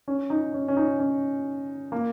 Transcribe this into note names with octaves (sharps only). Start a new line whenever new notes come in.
C#4
D#4
C#4
C#4
D#4
C#4
A#3